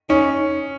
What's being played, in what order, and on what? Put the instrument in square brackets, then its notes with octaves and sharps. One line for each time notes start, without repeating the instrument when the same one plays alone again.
[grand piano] C#4 [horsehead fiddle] D#4